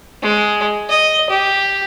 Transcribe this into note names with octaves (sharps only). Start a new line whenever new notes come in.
G#3
D#5
G4